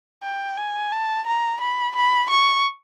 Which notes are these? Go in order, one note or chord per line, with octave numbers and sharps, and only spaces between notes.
G5
G#5
A5
A#5
B5
B5
C#6